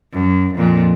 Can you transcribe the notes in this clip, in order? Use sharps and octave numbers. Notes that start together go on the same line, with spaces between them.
F#2
F2 A#2